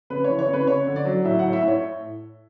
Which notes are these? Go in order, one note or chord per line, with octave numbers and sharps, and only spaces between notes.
C#3 B4
E3 C#5
C#5
C#3
B4
C#4 C#5
D3
D5
F#3
A2 E5
A2 F#5
E5
A2
C#5